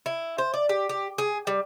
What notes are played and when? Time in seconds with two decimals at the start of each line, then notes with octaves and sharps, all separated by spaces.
0.06 E4
0.38 C5
0.54 D5
0.69 G4
0.89 G4
1.18 G#4
1.47 G3